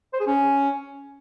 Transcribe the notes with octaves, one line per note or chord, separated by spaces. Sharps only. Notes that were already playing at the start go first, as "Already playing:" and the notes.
C5
G#4
C#4